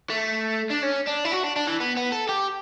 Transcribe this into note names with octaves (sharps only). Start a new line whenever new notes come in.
A3
D4
C#4
D4
E4
F#4
D4
D4
E3
B3
B3
A4
G4